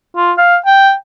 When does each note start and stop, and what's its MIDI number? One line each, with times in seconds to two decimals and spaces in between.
0.17 0.33 65
0.38 0.57 77
0.66 0.94 79